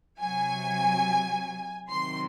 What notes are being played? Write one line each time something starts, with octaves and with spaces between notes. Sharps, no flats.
C3 F#3 G#5
C3 D#3 F#3 C6